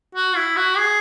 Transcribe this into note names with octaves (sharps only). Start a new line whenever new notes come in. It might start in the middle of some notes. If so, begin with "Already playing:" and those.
F#4
E4
F#4
G#4